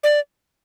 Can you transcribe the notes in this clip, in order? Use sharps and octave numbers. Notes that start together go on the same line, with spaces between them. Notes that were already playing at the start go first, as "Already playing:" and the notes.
D5